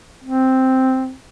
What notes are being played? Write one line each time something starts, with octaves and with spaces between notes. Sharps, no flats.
C4